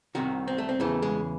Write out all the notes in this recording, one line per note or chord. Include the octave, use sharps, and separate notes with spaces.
C2 C3 D#3 F#4
C4
A3
C4
E2 C#3 E3 A3
G#3